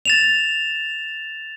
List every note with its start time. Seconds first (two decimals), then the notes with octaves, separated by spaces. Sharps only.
0.05 A6 E7 F7